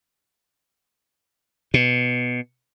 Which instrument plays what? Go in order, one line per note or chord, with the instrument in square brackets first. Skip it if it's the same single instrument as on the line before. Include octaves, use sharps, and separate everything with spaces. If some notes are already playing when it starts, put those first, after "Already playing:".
[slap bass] B2